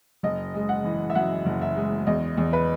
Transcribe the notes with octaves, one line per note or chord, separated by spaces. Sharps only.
F#1 D#5
G#3
F#5
E3
E5
F#2 F#5
F#1
E5
G#3
E2 D#5
E2
B4